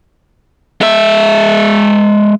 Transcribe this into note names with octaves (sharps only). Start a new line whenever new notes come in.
G#3 E5